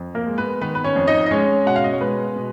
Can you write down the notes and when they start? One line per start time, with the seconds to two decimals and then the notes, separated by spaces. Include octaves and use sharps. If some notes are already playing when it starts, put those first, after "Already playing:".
Already playing: F2
0.15 A#3 A#4
0.26 G#3
0.38 B3 B4
0.61 D#3 B3 B4
0.75 B4
0.84 C#4 C#5
0.96 F2
1.08 D#4 D#5
1.26 D#5
1.31 G#3 C#4 C#5
1.66 B2 F#5
1.76 F5
1.84 D#5
1.93 C#5
2.01 G#3 B3 B4
2.36 B2